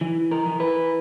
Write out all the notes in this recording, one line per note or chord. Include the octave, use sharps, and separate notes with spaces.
E3
A#4
E3
B4